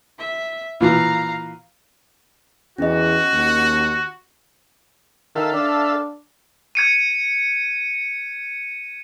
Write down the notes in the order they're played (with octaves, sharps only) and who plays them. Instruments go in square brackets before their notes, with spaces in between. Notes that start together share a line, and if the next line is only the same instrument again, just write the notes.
[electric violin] E5
[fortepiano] A#2 E3 [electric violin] F5 A#5
[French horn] E2 [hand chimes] C#4 D#5 [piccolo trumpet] F#4
[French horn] D#2
[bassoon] D#3 [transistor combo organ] A4 E5 F5
[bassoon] D4
[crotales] G#6 C#7 D#7